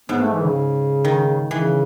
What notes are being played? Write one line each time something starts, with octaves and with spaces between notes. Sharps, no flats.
G#2 B3
A3
E3
C#3
D#3
C#3 E3